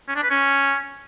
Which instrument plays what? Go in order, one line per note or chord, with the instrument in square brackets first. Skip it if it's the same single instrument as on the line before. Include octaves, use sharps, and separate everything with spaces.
[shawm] C#4
D4
B4
C#4